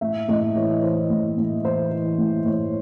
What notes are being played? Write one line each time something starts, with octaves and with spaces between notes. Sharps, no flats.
A2 E5
A2 D#5
E3 C#5
E3 C5
A2
A2
E3 C5
E3
A2
A2 C#5